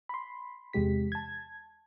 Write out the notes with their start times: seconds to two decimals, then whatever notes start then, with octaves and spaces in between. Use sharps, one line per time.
0.09 B5 C6
0.73 E2 C3 G#3 G4 B6
1.12 A5 G#6